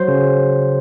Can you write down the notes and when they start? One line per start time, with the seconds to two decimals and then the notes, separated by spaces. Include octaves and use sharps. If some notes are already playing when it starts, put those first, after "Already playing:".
Already playing: F#3 C5
0.08 C#3